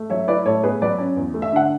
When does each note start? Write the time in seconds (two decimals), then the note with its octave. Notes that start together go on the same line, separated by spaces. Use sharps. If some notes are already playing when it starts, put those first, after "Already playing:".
Already playing: A3
0.10 F#3 C#5 E5
0.27 E4 B4 D5
0.45 A2 A4 C#5
0.63 B3 G#4 B4
0.82 F#3 B4 D5
0.98 C#4
1.17 E2
1.34 A3
1.42 E5
1.52 D3 F#5